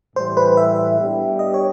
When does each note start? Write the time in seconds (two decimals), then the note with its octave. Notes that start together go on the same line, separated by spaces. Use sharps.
0.16 A2 E3 G3 C5
0.37 B4
0.57 E5
0.98 G3 B3 D4 G4
1.39 D#5
1.54 C#5